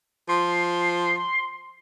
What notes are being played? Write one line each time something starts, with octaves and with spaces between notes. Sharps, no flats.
F3 C6